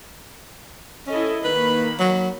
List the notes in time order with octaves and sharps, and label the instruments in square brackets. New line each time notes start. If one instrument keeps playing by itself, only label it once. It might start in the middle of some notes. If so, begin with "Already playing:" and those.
[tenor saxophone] C#4 [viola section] E4 A4 D#5
[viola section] D#3 A#3 B5 [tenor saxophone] B4
[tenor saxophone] F#3